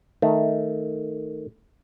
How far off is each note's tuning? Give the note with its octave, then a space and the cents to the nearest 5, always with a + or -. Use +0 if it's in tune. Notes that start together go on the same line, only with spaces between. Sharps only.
D#3 +0 A3 +0